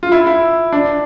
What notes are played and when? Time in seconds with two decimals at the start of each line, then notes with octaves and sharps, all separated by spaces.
0.03 F4
0.12 E4
0.27 E4
0.72 D4